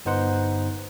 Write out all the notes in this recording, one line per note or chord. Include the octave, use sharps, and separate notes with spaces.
G1 B3 D#4 C5 F#5 F#6